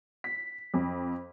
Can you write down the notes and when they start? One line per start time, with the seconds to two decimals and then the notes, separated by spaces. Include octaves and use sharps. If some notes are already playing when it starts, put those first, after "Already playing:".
0.24 B6
0.74 F2